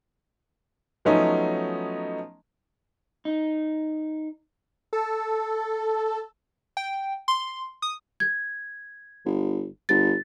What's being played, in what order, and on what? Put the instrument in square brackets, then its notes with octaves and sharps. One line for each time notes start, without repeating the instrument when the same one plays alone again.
[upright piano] F3 F#3 A3 B3 C#4 D#4
[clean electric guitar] D#4
[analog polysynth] A4
[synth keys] G5
C6
D#6
[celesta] G#6
[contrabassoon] G1
[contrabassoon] G1 [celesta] A6